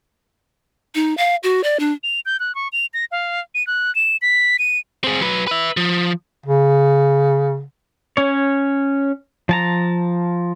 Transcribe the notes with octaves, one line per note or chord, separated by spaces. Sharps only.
D#4
F5
F#4
D5
D4
F7
G6
F#6
C#6
F7
A#6
F5
D#7
F#6
E7
B6
D#7
C4 G#4
F#3 B4
B4 E5
F3
C#3
C#4 C#5
F3 A5 A#5